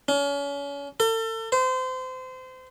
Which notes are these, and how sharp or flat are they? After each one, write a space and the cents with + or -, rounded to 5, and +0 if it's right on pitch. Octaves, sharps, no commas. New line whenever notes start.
C#4 +35
A4 +40
C5 -30